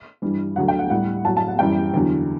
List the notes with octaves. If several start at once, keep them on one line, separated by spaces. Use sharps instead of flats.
G2 E3 G3
D2 D3 F#3 F#5
G5
F#5
A2 G3 F#5
A2 F#3 A5
A5
F#5
F#2 E3 G3 G5
E2 D3 F#3